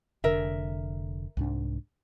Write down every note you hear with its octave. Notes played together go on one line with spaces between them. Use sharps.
F1 D3 A#4 E5
C2 G#2 D4